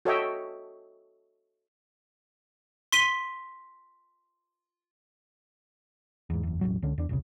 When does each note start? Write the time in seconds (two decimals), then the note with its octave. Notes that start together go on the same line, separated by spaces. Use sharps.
0.05 F#4 A4 C#5 D#5 E5 G5
2.92 C6 B6 D#7 G7
6.30 E2 G#2
6.43 F#1 E2
6.61 E1 A1 F2 F#3
6.82 C#2 D3 C#4
6.98 E2 D4
7.09 E1 C2 C#3